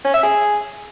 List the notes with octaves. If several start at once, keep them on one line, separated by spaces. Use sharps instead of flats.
C#4
E5
G#4